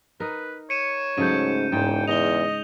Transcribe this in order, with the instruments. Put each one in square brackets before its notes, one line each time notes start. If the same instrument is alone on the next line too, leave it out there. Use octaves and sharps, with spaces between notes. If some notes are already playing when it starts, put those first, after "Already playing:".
[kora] D#4 A#4 [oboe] B4
[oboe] C#5 [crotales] C#7 D#7 E7
[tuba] G#2 [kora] C#3 F#3 A3 [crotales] G6 D#7
[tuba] E1 [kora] G#2 [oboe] G5
[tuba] E2 [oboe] D#5 [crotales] F7 G7